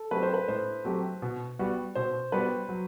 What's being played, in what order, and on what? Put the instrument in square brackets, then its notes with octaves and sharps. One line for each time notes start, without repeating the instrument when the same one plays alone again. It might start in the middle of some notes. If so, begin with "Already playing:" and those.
Already playing: [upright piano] A4
[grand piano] F#3 A3 C4 G4 [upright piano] B4
[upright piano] C5
B4
[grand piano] A2 [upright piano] C5
[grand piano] F#3 A3 C4 G4
B2
G3 B3 F#4
[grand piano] B2 [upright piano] C5
[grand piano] G3 B3 F#4 [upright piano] B4
[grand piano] F#3